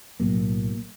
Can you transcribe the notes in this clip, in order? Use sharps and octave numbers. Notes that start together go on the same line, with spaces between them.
B1 A2 F#3 A#3